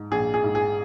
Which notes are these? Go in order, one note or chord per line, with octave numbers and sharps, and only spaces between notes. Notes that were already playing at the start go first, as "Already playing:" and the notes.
Already playing: G#2
A#1 G#4
G#4
G#2
G#4